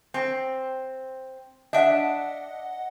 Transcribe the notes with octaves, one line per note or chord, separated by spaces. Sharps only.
C4
D4 D#5 E5 F#5